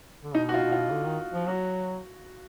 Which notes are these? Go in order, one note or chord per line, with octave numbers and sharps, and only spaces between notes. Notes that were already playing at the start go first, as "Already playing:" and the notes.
D3
B2 D#4
F#4
F4
B2
F4
D3
D#3
F3
F#3 F#4